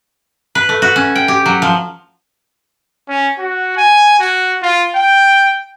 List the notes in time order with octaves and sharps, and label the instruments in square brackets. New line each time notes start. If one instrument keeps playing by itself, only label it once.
[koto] B4
A3
F#4
C#4
G5
G4
F#3
F3
[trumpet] C#4
F#4
G#5
F#4
F4
G5